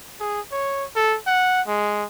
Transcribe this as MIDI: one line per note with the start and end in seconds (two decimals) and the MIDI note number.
0.20 0.40 68
0.52 0.84 73
0.95 1.16 69
1.26 1.61 78
1.67 2.04 56